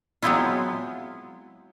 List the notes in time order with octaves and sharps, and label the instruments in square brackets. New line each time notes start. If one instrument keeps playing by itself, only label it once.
[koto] F#3 G#3 B3 C4 E4 F4